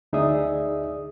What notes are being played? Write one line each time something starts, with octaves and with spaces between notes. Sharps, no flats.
D2 D#4 G#4 D5 E5 D#6